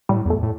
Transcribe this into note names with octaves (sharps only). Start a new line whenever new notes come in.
A2 G3
E2
A3
A2